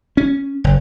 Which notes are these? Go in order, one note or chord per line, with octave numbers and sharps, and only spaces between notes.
C#4
F#1